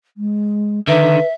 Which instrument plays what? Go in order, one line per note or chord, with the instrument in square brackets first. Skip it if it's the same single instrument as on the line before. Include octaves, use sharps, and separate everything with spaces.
[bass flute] G#3
[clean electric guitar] D3 D#3 [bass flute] B4 [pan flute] E5